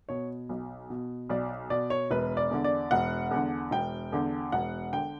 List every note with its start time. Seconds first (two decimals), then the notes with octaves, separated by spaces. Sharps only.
0.09 B2 C#5
0.49 B1
0.90 B2
1.29 B1 D5
1.70 B2 D5
1.90 C#5
2.11 E1 B4
2.37 D5
2.51 E2 D3
2.64 D5
2.91 E1 F#5
3.31 E2 D3
3.71 E1 G5
4.12 E2 D3
4.52 E1 F#5
4.93 D3 G5